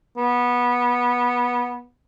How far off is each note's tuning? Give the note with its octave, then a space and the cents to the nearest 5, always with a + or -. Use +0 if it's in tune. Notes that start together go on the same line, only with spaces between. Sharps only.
B3 -15